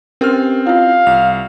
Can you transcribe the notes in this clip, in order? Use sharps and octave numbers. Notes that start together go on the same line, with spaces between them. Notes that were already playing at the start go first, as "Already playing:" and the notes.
C4 C#4 G4 A#4 F6
E4 F4 F5
C2 F7